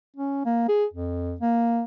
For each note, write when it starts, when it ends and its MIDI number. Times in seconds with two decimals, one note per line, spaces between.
0.17 0.43 61
0.45 0.67 58
0.68 0.85 68
0.93 1.35 41
1.40 1.83 58